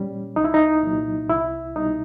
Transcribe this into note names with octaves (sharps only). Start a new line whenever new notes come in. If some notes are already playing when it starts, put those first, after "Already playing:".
Already playing: A#2 G3 C#4
C2 D#4
E4
D#4
A#2 F#3
C2 E4
B2 G3 D#4